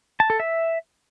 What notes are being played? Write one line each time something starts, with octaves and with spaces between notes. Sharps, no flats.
A5
A4
E5